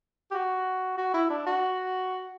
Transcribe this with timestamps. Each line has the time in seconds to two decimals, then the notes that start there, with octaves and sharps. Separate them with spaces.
0.31 G4
0.34 F#4
0.98 F#4
1.14 E4
1.30 D4
1.46 F#4